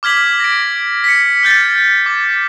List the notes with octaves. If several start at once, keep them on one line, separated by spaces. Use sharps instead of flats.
D6 F6 G#6 B6 F#7
A#6 D7
B6 C#7
F6 G6 A6
D6